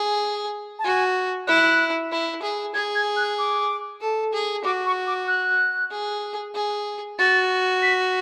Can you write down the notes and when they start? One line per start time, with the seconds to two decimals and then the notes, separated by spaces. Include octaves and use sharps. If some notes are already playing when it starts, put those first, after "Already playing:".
Already playing: G#4
0.79 A5
0.84 F#4 G#5
1.47 E4 F#6
2.12 E4
2.43 G#4
2.74 G#4 G#6
2.95 G#6
3.17 F#6
3.38 D6
4.01 A4
4.33 G#4
4.65 F#4 D6
4.86 C#6
5.07 D6
5.28 F#6
5.91 G#4
6.55 G#4
7.18 F#4 A6
7.82 B6